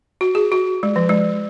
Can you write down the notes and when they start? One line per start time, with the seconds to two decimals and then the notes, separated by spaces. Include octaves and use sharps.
0.21 F#4
0.35 G#4
0.52 F#4
0.83 G#3
0.96 F3
1.09 G#3